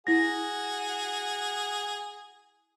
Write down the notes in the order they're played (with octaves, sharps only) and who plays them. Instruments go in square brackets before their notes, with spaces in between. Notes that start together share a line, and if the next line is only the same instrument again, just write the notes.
[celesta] E4 A#6 [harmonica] F#4 G#4